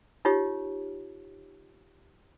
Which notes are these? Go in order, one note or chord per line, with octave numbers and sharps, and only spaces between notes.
D#4 F4 G4 C#5